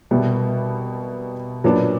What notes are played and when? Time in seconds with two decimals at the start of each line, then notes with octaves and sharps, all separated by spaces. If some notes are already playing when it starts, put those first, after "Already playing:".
0.11 C2 B2 G3 B3
1.64 A#2 F#3 B3 D4